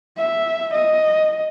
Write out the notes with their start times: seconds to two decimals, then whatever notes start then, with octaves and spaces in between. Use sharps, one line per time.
0.18 E5
0.73 D#5